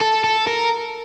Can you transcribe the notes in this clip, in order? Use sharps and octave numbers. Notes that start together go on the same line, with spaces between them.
A4
A4
A#4